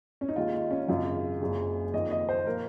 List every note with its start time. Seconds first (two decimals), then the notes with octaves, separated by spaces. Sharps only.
0.21 C#4
0.29 D#4
0.36 D#2 D#3 G#3 F4
0.54 D#4
0.71 C#4
0.88 G#1 F#2 C#3 G#3 F4
1.41 F#1 F#2 C#3
1.94 F2 D#3 A#3 D#5
2.11 D#5
2.29 C5
2.46 A#2 F3 A#3 A#4